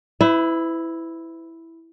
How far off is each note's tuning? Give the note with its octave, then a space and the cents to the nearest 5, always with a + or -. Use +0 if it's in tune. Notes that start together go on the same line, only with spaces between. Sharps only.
E4 +0 B4 +40